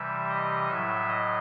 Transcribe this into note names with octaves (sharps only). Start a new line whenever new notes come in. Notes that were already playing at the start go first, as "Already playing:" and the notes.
Already playing: C3 E3 G3 E5
D#5
A2 F#3 E5
D#5